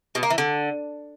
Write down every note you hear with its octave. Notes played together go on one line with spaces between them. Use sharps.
B2
A#3
E3
D3